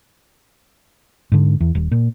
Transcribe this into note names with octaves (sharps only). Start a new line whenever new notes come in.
G#2 D3
E2
D#1
A#2